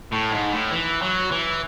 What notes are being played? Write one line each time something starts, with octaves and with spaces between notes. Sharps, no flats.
A2
G#2
A2
E3
F#3
E3